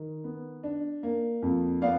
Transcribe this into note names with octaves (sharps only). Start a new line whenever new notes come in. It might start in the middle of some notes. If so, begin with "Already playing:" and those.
Already playing: D#3
B3
D4
A#3
F2
B3 D5 F5